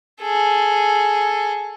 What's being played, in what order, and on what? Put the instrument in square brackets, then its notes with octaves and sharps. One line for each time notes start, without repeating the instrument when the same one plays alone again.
[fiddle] G#4 A4